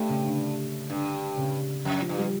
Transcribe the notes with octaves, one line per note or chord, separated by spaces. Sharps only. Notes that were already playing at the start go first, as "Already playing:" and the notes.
Already playing: G2 A3
C#3
D3
G2 D3
C#3
F2
F3
G2
G3